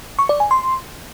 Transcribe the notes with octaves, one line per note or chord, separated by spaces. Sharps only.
C#6
D5
G#5
C6